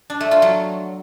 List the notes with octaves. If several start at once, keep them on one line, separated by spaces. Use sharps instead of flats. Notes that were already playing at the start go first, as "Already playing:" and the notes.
D4
A3
F4
F#3